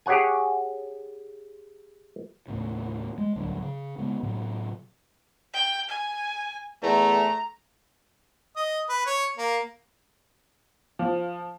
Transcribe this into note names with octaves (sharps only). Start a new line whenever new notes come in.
G4 G#4 C#5 F#5 G#5
D#2 A2 C#3
G#3
D1 C2 D3 F#3
C#3
C#3 G#3 B3
A2 C3 F#3
G5
G#5
E2 A3 A#5
D#5
B4
C#5
A#3
F3